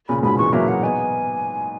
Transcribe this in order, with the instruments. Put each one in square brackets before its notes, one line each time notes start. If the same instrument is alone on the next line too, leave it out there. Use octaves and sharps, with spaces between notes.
[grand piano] A#2 C#3 [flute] B5
[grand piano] G#2 B2 [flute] B5
[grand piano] E3 G#3 [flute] C#6
[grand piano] F#3 A#3 [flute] E5
[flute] F#5
[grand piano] B3 D#4 [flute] G#5